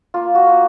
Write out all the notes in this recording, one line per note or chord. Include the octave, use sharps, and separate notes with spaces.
A#3 F4
F#4
A#3